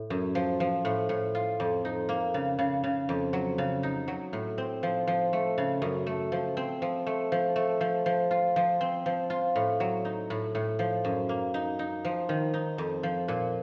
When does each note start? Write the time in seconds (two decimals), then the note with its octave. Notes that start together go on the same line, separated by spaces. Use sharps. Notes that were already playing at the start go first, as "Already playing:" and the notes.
Already playing: A2
0.10 F#2
0.35 F3
0.60 F3
0.85 A2
1.09 A2
1.35 F4
1.60 F2
1.85 D#4
2.09 A#3
2.34 C#3
2.59 C#3
2.84 C#3
3.09 F2
3.33 F#3
3.58 C#3
3.83 D#4
4.08 F#3
4.33 A2
4.58 C4
4.83 F3
5.07 F3
5.33 A3
5.58 C#3
5.82 F#2
6.07 A3
6.32 F3
6.57 C4
6.82 F3
7.07 A3
7.32 F3
7.56 A3
7.81 F3
8.06 F3
8.31 F4
8.56 F3
8.81 C4
9.06 F3
9.30 F4
9.56 A2
9.80 F#3
10.05 D#4
10.30 A2
10.55 A2
10.79 F3
11.05 F#2
11.29 A#3
11.54 D#4
11.79 D#4
12.05 F3
12.29 D#3
12.54 D#4
12.78 F2
13.03 F3
13.28 A#2